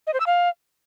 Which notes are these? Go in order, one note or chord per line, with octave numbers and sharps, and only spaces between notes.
D#5
C5
E6
F5